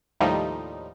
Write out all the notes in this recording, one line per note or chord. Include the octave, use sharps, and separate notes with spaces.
D#2 A2 F3 G3 D#4